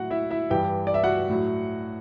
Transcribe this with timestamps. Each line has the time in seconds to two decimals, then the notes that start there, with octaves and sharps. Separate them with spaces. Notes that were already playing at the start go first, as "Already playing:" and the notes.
Already playing: A2 F#3 F#4 F#5
0.10 E4 E5
0.30 E4 E5
0.50 G2 E3 G4 G5
0.87 D5
0.94 E5
1.04 F#4 F#5
1.29 A2 F#3